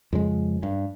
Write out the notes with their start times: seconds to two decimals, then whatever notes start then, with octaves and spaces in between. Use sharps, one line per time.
0.13 F2 C#3 G#3
0.63 G2